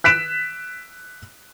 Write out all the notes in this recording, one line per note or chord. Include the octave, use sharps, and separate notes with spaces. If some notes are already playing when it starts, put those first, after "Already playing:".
F#6 B6 D7 E7